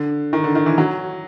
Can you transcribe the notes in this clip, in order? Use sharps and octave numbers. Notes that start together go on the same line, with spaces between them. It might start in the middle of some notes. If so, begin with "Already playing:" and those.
Already playing: D3
D#3
D3
D#3
E3
F#3